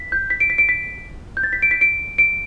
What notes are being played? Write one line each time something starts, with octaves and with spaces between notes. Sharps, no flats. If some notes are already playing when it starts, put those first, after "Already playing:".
Already playing: B6
G6
B6
D7
B6
D7
B6
G6
A6
B6
D7
B6
D7
D7